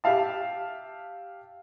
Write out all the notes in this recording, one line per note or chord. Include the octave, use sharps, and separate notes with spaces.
G4 E5 F5 A5